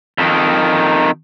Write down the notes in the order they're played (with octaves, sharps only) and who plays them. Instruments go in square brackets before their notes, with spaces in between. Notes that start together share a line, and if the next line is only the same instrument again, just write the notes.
[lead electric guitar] F2 D#3